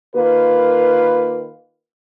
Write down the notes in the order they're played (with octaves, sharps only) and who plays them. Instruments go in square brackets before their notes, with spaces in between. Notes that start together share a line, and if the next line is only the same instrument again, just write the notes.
[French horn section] D#3 A#3 F4 B4